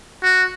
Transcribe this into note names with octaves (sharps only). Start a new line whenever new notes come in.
F#4